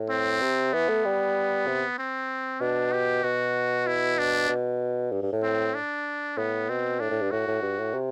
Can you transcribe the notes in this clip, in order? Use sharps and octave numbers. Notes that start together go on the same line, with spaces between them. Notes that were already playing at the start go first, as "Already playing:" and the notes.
Already playing: A2
C4
C3
E3 B3
A3
G3
C3
C4
B2 D4
G4
B2 F#4
E4
D4
B2
G2
G2
A2
C4
D4
A2 B3
B2 C4
A2 D4
A2
G2
A2 F#4
A2
G2
A2
C3